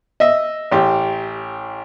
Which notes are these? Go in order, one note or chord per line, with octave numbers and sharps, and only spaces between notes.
D#5 E5
A1 G4